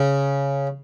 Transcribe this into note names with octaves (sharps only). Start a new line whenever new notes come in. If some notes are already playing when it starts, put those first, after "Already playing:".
Already playing: C#3